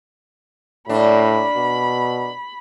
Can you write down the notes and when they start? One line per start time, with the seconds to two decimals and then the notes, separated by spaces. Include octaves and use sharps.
0.89 A2 A#3 D4 B5
1.57 B2